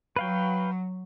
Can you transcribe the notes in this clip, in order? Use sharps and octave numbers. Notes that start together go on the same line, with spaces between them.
F#3 B4 F5 G5